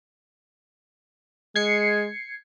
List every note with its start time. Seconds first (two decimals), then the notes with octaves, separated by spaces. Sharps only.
1.56 G#3 G#6 C7 C#7